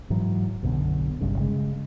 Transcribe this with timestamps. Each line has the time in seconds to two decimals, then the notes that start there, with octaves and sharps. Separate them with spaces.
0.10 G#2 E3 F#3
0.63 B1 F#2 D3 B3
1.21 G1 C2 G2 C#3
1.38 C#3 G#3